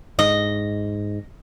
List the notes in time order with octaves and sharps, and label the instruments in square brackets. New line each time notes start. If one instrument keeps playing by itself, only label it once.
[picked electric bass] G#2 [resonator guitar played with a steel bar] D#5